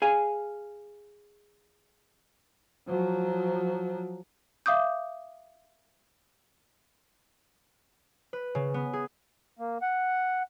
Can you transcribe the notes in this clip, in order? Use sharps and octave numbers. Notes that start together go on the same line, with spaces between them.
G#4 F5 G#5
F3 F#3
E5 F5 D6 D#6 G6
B4
C#3
B3
G#4
A#3
F#5